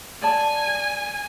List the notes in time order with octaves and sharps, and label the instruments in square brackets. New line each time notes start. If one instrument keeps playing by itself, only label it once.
[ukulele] D5 A5 [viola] G#5